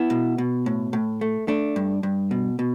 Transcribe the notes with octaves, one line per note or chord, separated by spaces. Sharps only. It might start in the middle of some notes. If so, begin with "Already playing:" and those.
Already playing: B3 E4
B2
B2
A2
A2
A3
A3 D4
G2
G2
B2
B2